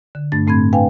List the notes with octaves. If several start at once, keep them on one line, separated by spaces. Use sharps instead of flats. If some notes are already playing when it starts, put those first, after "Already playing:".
D3
G2 A3 D4 A6
A2 A3 C4 B5 G#6
D4 B4 F5 G5 G#5